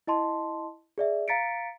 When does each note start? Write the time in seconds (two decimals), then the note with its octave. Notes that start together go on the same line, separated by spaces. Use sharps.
0.07 E4 D#5 A5 C6
0.98 G#4 D5 E5
1.28 F5 A#5 A6 B6 C#7 D7